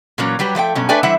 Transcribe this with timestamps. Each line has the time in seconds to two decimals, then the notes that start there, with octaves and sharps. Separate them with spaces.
0.18 A#2 E3 F#3 A#3 C#4
0.39 F#3 G3 G4 B4
0.55 F3 A3 D5 G5
0.75 G2 B2 F#3 C#4
0.89 A3 D4 B4 D5 G5 G#5
1.03 E3 G3 E4 C5 E5 F#5